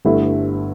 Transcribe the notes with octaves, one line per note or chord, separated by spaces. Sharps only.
G1 G2 D3 A3 E4